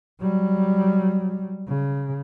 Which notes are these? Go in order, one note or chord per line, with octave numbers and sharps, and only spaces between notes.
F#3 G3
C#3